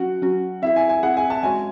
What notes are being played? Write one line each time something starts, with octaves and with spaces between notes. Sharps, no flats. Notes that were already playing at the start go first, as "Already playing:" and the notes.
Already playing: F#3 C#4 F#4 F#5
F#3 C#4 F#4
C4 E4 G#4 E5
G#5
G#5
C4 E4 G#4 F#5
G#5
A5
G#3 C#4 F#4 C#5 G#5